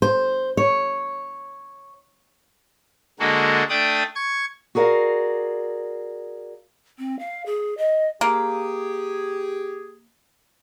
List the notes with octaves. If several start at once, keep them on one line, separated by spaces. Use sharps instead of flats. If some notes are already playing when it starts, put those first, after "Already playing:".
C5
C#5
D3 G#3 A#3 F#4 A4
A3 D4 D5 G5 D#6
C#6 G#6
F#4 G#4 A#4 D5 F5
C4
F5
G#4
D#5
A#3 G4 G#4